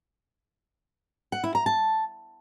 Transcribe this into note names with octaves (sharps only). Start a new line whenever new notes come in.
F#5
E4
A#5
A5